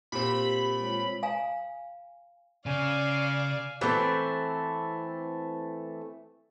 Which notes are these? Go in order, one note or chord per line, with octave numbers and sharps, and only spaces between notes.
A#2 C4 G4 B5
G#3 F4 C#5
F5 G#5 A#5
C#3 D5 F5 G#5
E3 A3 A#3 C4